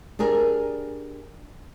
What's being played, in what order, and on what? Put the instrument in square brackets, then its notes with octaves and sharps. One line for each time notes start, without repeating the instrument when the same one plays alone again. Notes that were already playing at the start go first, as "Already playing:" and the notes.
[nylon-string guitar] D4 G4 G#4 A#4